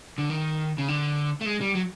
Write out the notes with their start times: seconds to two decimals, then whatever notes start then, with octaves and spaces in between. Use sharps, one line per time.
0.18 D3
0.30 D#3
0.78 C#3
0.88 D3
1.41 A3
1.46 G#3
1.61 G3
1.75 F#3